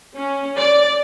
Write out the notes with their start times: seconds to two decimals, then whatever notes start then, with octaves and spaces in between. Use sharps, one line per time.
0.16 C#4
0.56 D5